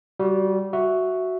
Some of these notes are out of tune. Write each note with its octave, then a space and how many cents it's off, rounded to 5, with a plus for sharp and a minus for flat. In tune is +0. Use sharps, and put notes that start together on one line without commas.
G3 -20 F#4 +0
F#4 +0 E5 +0